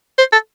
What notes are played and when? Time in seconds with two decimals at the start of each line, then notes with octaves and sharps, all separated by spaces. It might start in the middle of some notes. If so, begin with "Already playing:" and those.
0.18 C5
0.33 A4